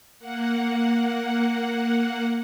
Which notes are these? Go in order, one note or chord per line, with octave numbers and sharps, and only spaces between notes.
A#3 F#5